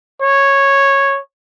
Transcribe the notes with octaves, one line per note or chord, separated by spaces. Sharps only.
C#5